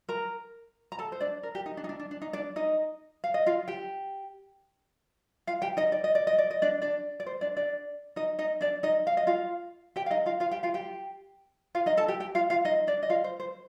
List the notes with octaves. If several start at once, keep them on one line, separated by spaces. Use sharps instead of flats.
A#4 A#5
A#5
A4 A5
C5
D4 D5
A#4
G4
D#4
D4
D#4
D4
D4
D4
D#4
D4 D5
D#4 D#5
F5
D#5
F4 F5
G4 G5
F4 F5
G4 G5
D#4 D#5
D5
D#5
D5
D#5
D5
D#5
D4 D5
D4 D5
D5
C5
D4 D5
D4 D5
D#4 D#5
D#4 D#5
D4 D5
D#4 D#5
F5
D#5
F4 F5
G4 G5
F5
D#4 D#5
F4 F5
F4 F5
G4 G5
F4 F5
G4 G5
F4 F5
D#4 D#5
A4 A5
G4 G5
G4 G5
F4 F5
F4 F5
D#4 D#5
D4 D5
D#5
F4 F5
C5
C5